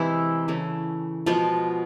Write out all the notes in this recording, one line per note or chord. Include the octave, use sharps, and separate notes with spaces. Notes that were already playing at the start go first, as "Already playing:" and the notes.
Already playing: C3 E3 G#3 E4
C#3 E3 A3
B2 F3 G#3 B3 F4